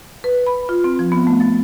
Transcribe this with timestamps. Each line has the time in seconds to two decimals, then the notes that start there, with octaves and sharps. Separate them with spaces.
0.24 B4
0.47 B5
0.69 F4
0.84 C4
0.99 F3
1.12 B3
1.27 A3
1.40 A6